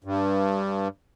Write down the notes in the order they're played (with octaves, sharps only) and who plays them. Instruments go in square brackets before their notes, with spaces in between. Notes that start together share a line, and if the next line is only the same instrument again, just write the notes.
[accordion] G2